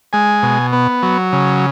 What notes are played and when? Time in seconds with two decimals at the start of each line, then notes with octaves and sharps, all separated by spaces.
0.13 G#3 G#5
0.43 B2
0.73 B3
1.03 F#3
1.33 C#3